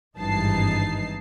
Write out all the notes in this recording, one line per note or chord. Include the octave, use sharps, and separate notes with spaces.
G#1 G2 E3 D#4 A5 C7